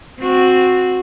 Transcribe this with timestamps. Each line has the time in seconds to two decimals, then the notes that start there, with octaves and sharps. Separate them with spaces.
0.20 C4 F#4